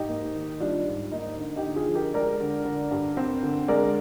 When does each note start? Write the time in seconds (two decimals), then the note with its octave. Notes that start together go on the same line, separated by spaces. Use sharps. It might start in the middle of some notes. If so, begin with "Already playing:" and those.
Already playing: G#2 D#4 G4
0.09 A#3
0.35 D#3
0.60 G3 D4 F4
0.86 G#2
1.12 A#3 D#4
1.38 D3
1.56 D#4 G4
1.64 D3
1.76 F4 G#4
1.88 F3
1.95 G4 A#4
2.14 G#3 A#4 D5
2.41 D3
2.65 D3
2.91 G2
3.17 C4
3.43 D3
3.68 G#3 A#4 D5